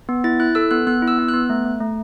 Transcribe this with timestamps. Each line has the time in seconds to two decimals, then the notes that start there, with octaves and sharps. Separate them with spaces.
0.09 B3
0.24 E4 A6
0.40 E4 F#6
0.55 A4 E6
0.71 B3 F#6
0.87 B3 F#6
1.02 E4
1.08 E6
1.18 B3
1.28 F#6
1.34 B3
1.50 A3
1.65 A3
1.80 A3